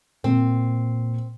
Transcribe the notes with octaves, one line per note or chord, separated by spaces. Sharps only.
A#2 C4